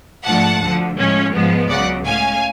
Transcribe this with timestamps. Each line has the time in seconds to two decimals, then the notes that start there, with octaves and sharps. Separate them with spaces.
0.25 G#2 F3 A3 D4 F#5 A5
0.61 D2 D3 F3
0.98 A2 F3 G#3 C#4
1.34 G#2 F3 G#3 B3
1.69 C#2 C#3 F#3 D5 F#5
2.05 A2 G#3 C#4 F5 G#5